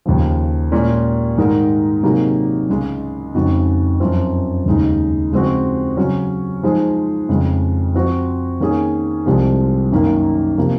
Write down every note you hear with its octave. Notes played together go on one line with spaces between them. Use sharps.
D#2 C#3 F3
A#2 G#3 C#4
G#2 D#3 G#3 D#4 A#4
C3 F#3 A#3 D#4 G#4
C#2 C#3 G#3
F2 C#3 G#3 D#4 F#4
F#2 F3 C4 F4
D#2 C#3 G#3 D#4
C#3 F3 G#3 C4 F#4
C#3 F#3 C#4
F3 G#3 D#4 G#4 C5
F2 C#3 F3 G#3
F3 C4 F#4 C5
D#3 A#3 C#4 G#4
C2 C3 F3 G#3
F#2 D#3 A#3
C3 F3 A#3